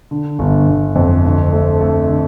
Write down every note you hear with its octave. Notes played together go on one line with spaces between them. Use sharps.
D3
G1
G1
F2
D2
A3
A3
D3